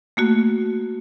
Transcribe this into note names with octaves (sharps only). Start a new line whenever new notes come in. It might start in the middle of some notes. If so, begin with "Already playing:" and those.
A3 A#3 F#4